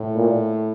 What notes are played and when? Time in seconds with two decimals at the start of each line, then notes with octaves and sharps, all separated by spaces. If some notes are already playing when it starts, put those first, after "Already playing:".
Already playing: A2
0.15 A#2